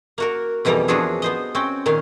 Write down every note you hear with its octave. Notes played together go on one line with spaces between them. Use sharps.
A#3 F#4 A#4
F2 B2 E3 G3 A#3 A#5
E2 F3 D4 F#4 G#4 E5
B3 C5 D#5
C4 C#4 F#4 G5
A#2 D#3 C#4 F5